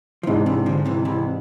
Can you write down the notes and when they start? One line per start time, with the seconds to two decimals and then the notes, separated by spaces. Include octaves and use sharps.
0.23 F3
0.27 G#2 C3 E3 G#3 D4
0.46 C3 E3
0.66 D3 F3
0.86 C3 E3
1.05 C3 E3